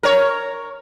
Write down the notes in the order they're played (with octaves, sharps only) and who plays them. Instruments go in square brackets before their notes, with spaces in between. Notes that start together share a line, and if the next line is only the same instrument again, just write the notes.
[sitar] A#4 C#5